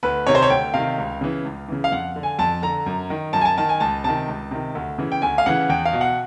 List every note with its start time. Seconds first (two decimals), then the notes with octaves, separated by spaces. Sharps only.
0.03 D2 B4
0.27 C3 D#3 C#5
0.35 C5
0.42 C#5
0.50 D2 G5
0.74 C3 D#3 F5
0.98 C#2
1.21 C#3 E3
1.44 C#2
1.68 C#3 E3
1.84 F5
1.92 F2 F#5
2.16 D3
2.23 G#5
2.39 F2 A5
2.62 D3 A#5
2.86 F#2
3.10 D#3
3.33 F#2 A5
3.41 G#5
3.45 A5
3.58 D#3 A5
3.69 G#5
3.80 C#2 A5
4.04 C3 D#3 A5
4.28 C#2
4.51 C3 D#3
4.75 D2
4.98 C#3 E3
5.12 G5
5.22 D2 G#5
5.38 F5
5.46 C#3 E3 F#5
5.69 E2 G5
5.85 F5
5.93 B2
6.01 F#5